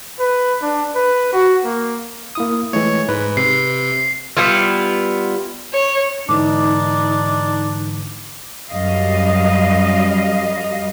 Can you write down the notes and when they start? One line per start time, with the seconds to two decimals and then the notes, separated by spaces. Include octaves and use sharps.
0.20 B4
0.63 D4
0.95 B4
1.33 F#4
1.64 A#3
2.35 A#3 E4 D#6
2.73 E3 G#3 A3 C#5
3.09 G#2 B4
3.37 C3 C7
4.37 G3 B3 E4 F4
5.73 C#5
6.29 G#2 D3 E3 D4 D#4 D6
8.70 F#2 G3 D#5 F5